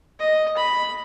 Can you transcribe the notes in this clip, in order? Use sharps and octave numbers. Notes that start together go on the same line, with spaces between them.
D#5
B5